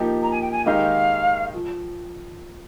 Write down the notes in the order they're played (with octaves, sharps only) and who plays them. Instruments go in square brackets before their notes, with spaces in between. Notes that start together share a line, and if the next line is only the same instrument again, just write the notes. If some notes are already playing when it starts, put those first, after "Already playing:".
Already playing: [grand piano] F3 A#3 D#4 G4
[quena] A#5
G#5
G5
G#5
[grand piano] D#3 G#3 D#4 G4 [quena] F5
[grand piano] F3